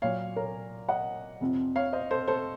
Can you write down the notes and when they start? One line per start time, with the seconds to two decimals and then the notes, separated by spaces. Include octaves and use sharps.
0.02 A#2 F#3 C#5 F5
0.36 A#4 C#5
0.89 D#5 F#5
1.41 F2 C3 F3
1.76 C#5 F5
1.93 C5 D#5
2.11 A4 C5
2.28 A4 C5